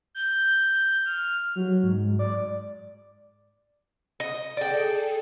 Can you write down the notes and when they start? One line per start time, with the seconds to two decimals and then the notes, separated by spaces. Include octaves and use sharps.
0.15 G6
1.06 F6
1.55 F#3
1.83 G#2
2.19 D5
4.20 D#5
4.57 G#4 A4 D5 G5